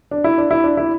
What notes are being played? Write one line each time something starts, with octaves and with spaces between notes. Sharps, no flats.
D4
E4
D4
E4
D4
E4